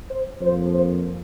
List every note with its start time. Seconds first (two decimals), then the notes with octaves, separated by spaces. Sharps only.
0.10 C5
0.41 F2 F3 A#3 C5
0.72 C5